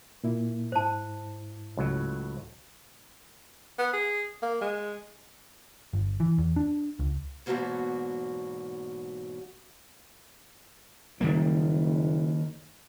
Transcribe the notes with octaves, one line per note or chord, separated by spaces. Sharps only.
A#2 A#3 E4
G#2 E4 C5 A5
C#2 A2 F#3
B3
G#4
A#3
G#3
G1
E3
E2
D4
C#2
E2 G#2 B2 F#3 A#3 F#4
F#1 D#3 G3 A#3